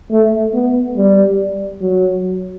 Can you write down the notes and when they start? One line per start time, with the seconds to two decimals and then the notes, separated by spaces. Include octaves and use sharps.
0.11 A3
0.53 B3
0.97 G3
1.81 F#3